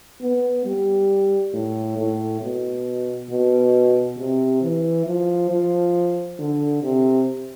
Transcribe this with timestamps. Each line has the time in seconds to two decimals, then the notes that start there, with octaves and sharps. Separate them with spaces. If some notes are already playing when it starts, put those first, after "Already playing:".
0.21 B3
0.65 G3
1.53 A2
1.98 A2
2.42 B2
3.30 B2
4.18 C3
4.62 E3
5.06 F3
5.50 F3
6.39 D3
6.82 C3